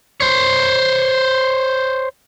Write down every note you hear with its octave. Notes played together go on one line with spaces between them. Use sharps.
C5 C#5